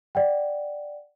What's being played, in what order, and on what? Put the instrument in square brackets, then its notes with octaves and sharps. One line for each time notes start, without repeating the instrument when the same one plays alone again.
[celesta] D5 F#5 G5